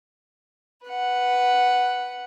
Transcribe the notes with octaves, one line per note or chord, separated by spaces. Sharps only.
B4 F#5